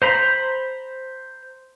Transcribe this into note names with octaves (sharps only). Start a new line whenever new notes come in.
C5 A#5 B5